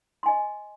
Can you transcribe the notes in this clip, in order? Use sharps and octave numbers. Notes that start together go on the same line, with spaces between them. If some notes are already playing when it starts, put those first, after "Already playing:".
D#5 G#5 C6